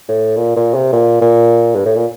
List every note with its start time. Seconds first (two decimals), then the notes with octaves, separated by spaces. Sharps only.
0.09 A2
0.37 A#2
0.56 A#2
0.74 C3
0.93 A#2
1.21 A#2
1.75 G2
1.85 A2
1.96 A#2